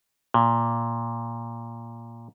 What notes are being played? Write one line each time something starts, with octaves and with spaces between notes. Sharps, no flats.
A#2